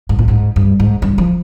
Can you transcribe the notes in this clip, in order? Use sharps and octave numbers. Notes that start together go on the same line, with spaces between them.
G#2
A#2
G#2
G2
G#2
G2
F3